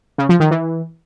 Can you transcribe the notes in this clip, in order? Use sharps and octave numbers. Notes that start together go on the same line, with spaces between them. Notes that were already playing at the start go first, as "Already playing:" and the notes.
C#3
F3
D#3
E3